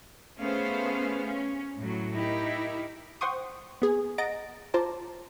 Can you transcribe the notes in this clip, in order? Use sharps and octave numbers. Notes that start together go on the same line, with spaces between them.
A3 B3 C#4 G#4 C5 F5
C#4
A2 F#3
D#4 E4 G4 A#4
C5 F#5 G5 C6 C#6 D#6
B3 G#4
D#5 F#5 A#5 A6 A#6 D7
F4 C5 A5 A#5 D6